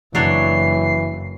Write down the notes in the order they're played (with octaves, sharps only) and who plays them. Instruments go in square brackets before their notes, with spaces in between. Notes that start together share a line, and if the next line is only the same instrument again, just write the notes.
[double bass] F#1 [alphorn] E3 [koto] F#3 D4 C#5 [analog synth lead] C7